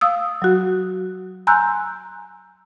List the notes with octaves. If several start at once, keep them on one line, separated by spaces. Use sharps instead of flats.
F5 D#6 E6
F#3 F#4
G#5 A#5 C6 E6 F#6 G6